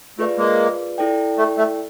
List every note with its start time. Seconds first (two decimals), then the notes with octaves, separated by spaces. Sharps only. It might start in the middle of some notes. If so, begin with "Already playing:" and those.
0.19 A3 F4 G#4 B4 D5 F5
0.38 G#3 A#3
0.98 E4 A4 D5 G5
1.38 A3
1.58 A3